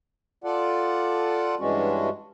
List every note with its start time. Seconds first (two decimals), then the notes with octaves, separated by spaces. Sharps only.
0.44 F4 A4 D5 F#5
1.60 G2 E3 G#3 C#4 D4 F#4